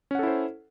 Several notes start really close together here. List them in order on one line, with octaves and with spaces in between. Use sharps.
C#4 F#5 A4 E4 C5